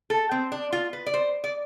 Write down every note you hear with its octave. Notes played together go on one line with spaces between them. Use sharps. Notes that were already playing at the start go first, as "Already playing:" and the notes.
A4
C4
D4
F4
B4
D5
C5
D5